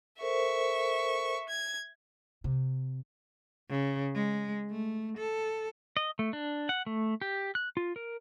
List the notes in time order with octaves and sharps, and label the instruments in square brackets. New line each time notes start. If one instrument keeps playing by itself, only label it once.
[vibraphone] A4 A#4 C5 [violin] E5 C#6
[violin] G#6
[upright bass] C3
[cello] C#3
G#3
A3
A4
[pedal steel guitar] D#5
A3
D4
F#5
A3
G4
F#6
F4
A#4